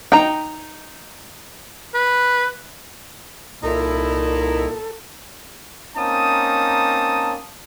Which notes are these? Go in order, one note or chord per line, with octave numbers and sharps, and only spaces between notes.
D#4 G5 A#5
B4
C2 A#2 D#4 E4 A4
A#3 C4 C#4 D#4 A5 D#6